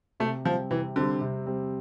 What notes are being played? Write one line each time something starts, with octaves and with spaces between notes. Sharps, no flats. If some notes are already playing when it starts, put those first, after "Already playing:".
C3 A3
F3 G3 C4
C3 E3
D3 G3 C4
C3
G3 C4